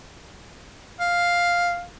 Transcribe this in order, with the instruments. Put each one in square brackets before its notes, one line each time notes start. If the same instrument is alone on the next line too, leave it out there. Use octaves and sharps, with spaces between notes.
[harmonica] F5